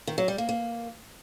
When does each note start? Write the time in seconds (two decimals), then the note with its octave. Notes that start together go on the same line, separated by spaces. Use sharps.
0.07 D#3
0.18 F#3
0.28 G3
0.38 A#3
0.49 A#3